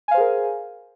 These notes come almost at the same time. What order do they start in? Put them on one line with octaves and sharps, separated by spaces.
G#5 F5 C5 G#4 A#4